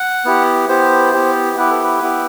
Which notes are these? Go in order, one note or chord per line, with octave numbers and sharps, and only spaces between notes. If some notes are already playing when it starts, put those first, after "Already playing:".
Already playing: F#5
B3 E4 G4
B3 E4 G4 C5
B3 E4 G4
B3 E4 G4 B4
A4
B4
B3 E4 G4